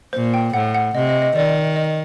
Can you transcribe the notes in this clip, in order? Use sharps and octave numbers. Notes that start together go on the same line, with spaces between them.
A#2 C5
G5
A2 F#5
F#5
C3 D#5
D#5
D#5
D#3 D5
D#5